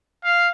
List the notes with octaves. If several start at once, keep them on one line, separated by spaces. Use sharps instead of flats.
F5